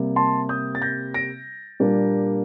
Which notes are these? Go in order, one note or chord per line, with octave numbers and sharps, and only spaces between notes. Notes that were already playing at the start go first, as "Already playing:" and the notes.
Already playing: C3 G3 A#3
A5 C6
D#6 G6
A6
G6 A#6
A#6 D7
A#2 G3 A#3 D4